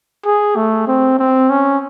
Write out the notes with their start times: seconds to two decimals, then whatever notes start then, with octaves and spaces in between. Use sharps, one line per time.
0.25 G#4
0.56 A3
0.87 C4
1.19 C4
1.50 C#4